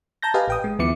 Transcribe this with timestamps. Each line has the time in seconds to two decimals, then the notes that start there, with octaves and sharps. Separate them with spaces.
0.22 A5 A#5 G6 A#6
0.34 G4 B4 D#5 F5 G#5
0.48 A1 G5 D#6
0.64 G#3
0.79 D#2 F3 B3 E4 D6 C#7